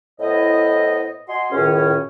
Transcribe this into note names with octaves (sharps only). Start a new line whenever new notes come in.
A2 B3 E4 C5 D#5
F#4 D#5 G#5 C6
C#2 F#2 A2 D#3 C#4